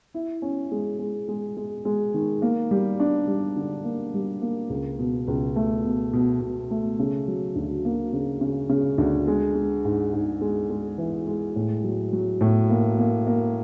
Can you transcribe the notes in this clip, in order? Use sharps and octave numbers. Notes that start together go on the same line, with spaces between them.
E4
C#4
G#3
G#3
G#3
G#3
G#3
D#3
A#3
G3
D4
G3
D3
A#3
G3
A#3
C#2
B2
C#2
A3
B2
B2
B2
A3
C#3
F#3
D2
A#3
C#3
C#3
C#3
D2
G#3
G#3
G#2
G#2
G#3
G#3
E3
G#3
A2
F#3
F#3
A2
A#3
A#3
A#3